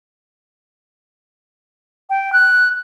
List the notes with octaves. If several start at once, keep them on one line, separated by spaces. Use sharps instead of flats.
G5
F#6